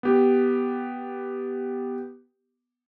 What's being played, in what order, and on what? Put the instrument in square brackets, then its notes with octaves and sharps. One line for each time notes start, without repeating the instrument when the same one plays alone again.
[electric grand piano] B3 G4